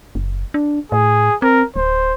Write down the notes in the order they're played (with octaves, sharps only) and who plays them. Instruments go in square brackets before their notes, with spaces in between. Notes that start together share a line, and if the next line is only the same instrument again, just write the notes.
[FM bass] F#1
D4
[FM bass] A2 [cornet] G#4
[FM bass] C4 [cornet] A#4
[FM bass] D1 [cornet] C5